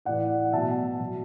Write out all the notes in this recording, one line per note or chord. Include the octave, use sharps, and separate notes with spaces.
A2 E3 D5 F#5
F#5
B2 F#3 E5 A5
B2 F#3